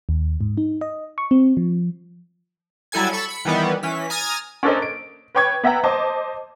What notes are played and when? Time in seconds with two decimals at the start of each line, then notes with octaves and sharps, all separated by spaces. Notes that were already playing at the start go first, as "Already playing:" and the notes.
0.09 D#2
0.41 G#2
0.57 D#4
0.81 D#5
1.18 C#6
1.31 C4
1.57 F3
2.92 F#3 G3 E4 A4 G#5 G#6
3.13 A4 B5 C#6 E6
3.29 B5 C#7
3.45 D#3 E3 G3 B3
3.83 E3 C#4 B6
4.10 G#5 A#5 D#6 F6 G#6 A6
4.63 C#4 D4 A4 A#4 C5 D#5
4.82 D7
5.35 B4 C#5 G5 C#6 G#6
5.63 B3 E5 F#5 G5 A#5
5.84 C5 D#5 A5 D6